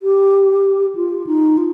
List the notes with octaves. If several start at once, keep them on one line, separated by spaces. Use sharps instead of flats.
G4
F4
D#4
F4